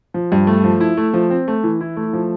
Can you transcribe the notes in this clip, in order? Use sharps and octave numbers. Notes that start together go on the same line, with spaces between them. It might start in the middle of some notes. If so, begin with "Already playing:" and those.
F3
G2
A3
F3
E4
A3
F3
C4
A3
E3
E4
A3
F3